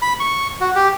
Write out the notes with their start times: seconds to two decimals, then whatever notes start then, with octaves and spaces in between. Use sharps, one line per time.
0.02 B5
0.20 C#6
0.61 F#4
0.75 G4